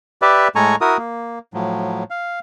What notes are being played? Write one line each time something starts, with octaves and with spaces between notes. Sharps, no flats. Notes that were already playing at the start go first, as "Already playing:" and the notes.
G4 B4 D5 E5
A2 G#3 A4 G#5 A#5 C#6
E4 F#4 A#4 D#6
A#3
A2 F3 F#3
F5